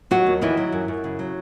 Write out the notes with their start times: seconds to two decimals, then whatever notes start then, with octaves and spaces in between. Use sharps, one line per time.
0.11 D#2 F#3 F#4
0.26 D#2
0.42 D#3 E3 E4
0.57 F#3
0.72 F#2
0.88 F#2
1.04 C#3
1.19 F#3